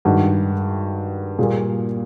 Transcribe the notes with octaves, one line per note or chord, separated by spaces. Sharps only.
G2 D#3 G#3 F#4
A#2 G3 A#3 G#4